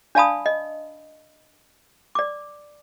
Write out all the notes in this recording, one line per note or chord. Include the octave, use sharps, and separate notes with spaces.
D4 D5 F5 A5 B5 D#6
D#5
D5 D6